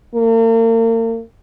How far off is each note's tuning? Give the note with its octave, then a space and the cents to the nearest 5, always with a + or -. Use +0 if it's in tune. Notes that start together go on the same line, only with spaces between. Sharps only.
A#3 -40